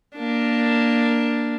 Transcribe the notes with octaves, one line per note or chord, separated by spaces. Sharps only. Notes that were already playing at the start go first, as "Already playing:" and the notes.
A#3 D4